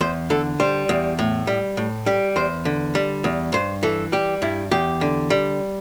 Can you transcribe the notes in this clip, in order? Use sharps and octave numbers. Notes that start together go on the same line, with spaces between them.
E2 C5
D3 A4
G3 C5
E2
A2
G3
A2
G3 G4
E2 C5
D3
G3
E2
G2 C5
E3 A4
G3 G4
G2 E4
E2 G4
D3
G3